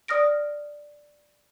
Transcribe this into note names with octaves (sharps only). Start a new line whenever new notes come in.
D5 D#6 F6 A#6 D7